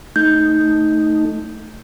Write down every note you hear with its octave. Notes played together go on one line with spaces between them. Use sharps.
A3 D#4 G6